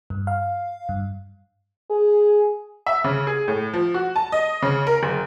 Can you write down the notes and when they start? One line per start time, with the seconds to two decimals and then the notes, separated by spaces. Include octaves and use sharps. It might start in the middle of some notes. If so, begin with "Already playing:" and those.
0.10 G2
0.27 F5
0.89 G2
1.90 G#4
2.86 E5
3.04 C#3
3.27 G#4
3.48 A2
3.73 F3
3.94 F#4
4.16 A5
4.32 D#5
4.62 C#3
4.87 A#4
5.03 F#1